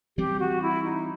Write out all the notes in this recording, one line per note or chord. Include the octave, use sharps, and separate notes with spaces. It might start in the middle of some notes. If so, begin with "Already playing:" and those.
E3 G3 C4 G4
F#4
E4
D#4